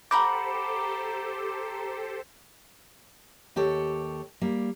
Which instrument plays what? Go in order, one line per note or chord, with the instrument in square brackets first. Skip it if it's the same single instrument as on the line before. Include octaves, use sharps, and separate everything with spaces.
[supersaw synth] G4 A4 C5 [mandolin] F#5 B5 G6 [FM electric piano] A#5 D6
[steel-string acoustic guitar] D#2 G4 A4 C#5
G3 A#3